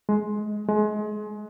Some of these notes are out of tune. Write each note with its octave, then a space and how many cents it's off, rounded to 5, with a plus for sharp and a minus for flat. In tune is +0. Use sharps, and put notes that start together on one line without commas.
G#3 +20
G#3 +30